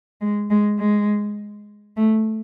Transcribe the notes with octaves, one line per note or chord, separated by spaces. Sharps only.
G#3
G#3
G#3
A3